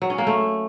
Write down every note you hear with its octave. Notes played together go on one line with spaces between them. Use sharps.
F#3
C#4
A#3
A3